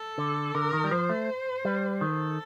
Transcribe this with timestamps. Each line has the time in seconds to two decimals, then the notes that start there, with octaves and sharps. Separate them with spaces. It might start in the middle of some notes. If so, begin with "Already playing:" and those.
Already playing: A4
0.18 D3
0.55 D3 A#4
0.73 D#3
0.84 G3
0.91 F3 C5
1.09 A3
1.65 G3
2.00 D#3 A4